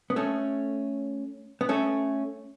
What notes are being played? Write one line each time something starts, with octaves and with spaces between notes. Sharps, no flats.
B3
A3 C#4
B3
A3 C#4